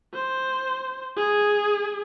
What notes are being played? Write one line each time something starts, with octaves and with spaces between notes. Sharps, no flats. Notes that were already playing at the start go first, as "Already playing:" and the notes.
C5
G#4